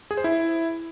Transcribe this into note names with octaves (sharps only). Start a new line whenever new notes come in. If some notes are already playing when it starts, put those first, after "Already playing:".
G#4
C5
E4